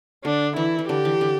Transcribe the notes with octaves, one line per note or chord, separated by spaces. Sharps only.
D3 D4
E3 E4
E3
D3 G4
E3
D3